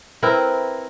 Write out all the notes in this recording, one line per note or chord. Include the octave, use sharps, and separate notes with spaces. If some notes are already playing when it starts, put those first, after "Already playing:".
C4 E4 A#4 B4